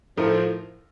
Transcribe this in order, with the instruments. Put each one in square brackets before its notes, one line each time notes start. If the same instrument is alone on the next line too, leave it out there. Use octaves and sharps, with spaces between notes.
[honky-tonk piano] A2 A3 D#4 A#4 [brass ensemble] F3